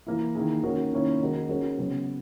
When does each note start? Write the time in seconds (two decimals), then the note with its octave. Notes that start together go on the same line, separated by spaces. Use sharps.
0.07 E3 A#3 E4
0.35 D#3 A#3 E4 G#4
0.63 D#3 A#3 C#4 F#4 A#4
0.93 D#3 A#3 C#4 E4
1.20 D#3 G#3 D#4 F#4 A#4
1.49 G#3 C#4 F#4 A#4
1.78 C#3 F#3 B3